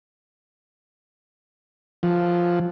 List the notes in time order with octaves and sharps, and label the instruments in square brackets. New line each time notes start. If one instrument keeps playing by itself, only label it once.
[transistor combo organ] F3